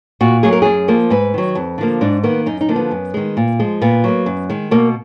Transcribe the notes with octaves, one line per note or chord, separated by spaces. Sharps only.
A#2 F#4
F#3 A#3 G#4
A#4
F#2 G#4
F3 A#3
G#2 B4
D#3 F#3
F2
D3 F3 A#3
G#2 D4
D#3 A#3 B3
F#2 D#4
D#4
D3 F3 A#3
B3
F#2
D#3 G#3
A#2
F3 G#3
A#2 B3
F#3 A#3
F#2
D#3 G#3
B2 A#3